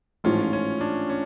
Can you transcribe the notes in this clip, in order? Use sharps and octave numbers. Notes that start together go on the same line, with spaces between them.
A1 G#2 F3 C#4 F4
C#4
D4
C#4